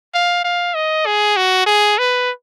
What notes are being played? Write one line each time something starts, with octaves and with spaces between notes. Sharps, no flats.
F5
F5
D#5
G#4
F#4
G#4
B4